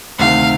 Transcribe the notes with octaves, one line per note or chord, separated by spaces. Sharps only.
D2 C3 D#3 F5